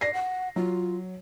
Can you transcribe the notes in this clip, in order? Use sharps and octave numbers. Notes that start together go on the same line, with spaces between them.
D5 A#6 C7
F#5
F#3 F4